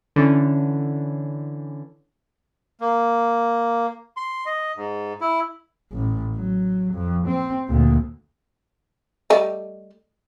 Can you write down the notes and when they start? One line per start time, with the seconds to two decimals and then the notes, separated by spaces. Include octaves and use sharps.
0.16 D3 E3 C#4
2.81 A#3
4.17 C6
4.46 D#5
4.77 G#2
5.21 E4
5.92 A1
6.36 F#3
6.94 F2
7.27 C4
7.68 D2 A#2
9.30 G3 A3 D#5